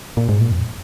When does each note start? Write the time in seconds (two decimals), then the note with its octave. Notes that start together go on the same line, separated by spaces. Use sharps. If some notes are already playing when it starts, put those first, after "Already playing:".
0.17 A#2
0.29 G#2
0.41 A#2
0.52 F2